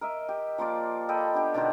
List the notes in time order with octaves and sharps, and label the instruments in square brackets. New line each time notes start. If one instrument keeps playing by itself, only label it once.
[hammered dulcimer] A#4 D#5 E5
G4
F3 A#3 F4 D5
A4 D#5 G5 B5
B3 D4 G4
B2 D3 D#3 C5